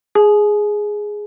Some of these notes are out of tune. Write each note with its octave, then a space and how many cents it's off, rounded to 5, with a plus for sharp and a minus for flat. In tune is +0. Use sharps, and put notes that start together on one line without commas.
G#4 +0 G#5 +35